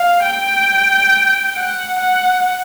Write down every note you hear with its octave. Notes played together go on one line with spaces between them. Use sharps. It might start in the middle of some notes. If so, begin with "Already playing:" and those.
Already playing: F5
G5
F#5
F#5